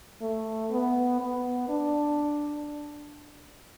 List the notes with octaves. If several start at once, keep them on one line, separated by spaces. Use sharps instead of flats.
A3
B3
B3
D4